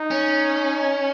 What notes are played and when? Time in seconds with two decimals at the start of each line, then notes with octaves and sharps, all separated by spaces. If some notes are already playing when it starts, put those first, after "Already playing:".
Already playing: D#4
0.11 C#4